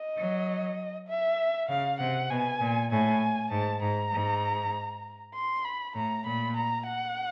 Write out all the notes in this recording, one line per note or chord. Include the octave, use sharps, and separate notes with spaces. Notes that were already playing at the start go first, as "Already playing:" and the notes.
Already playing: D#5
F#3
E5
C#3 F5
C3 F#5
B2 G#5
A#2
A2 G#5
G#2 A5
G#2 A#5
G#2
C6
B5
A2 A#5
A#2 B5
A#5
F#5